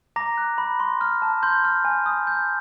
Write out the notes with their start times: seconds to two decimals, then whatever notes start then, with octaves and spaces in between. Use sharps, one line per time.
0.16 A#5 D6 A#6
0.38 F#6
0.58 B5
0.80 C6
1.01 F6
1.22 A5
1.43 C6 G6
1.64 F6
1.85 G#5
2.06 D#6
2.27 G6